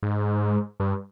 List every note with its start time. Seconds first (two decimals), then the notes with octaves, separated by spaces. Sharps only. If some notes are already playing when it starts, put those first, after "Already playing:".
0.03 G#2
0.80 G2